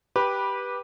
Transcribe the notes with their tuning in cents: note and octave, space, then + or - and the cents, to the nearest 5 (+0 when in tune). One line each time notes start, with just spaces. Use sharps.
G4 +0 B4 -15 D6 +0